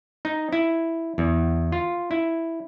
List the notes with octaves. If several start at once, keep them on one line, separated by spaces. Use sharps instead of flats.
D#4
E4
E2
F4
E4